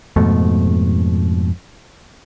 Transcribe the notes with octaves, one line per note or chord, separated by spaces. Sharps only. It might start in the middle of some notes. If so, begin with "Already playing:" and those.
F2 G#2 B2 A3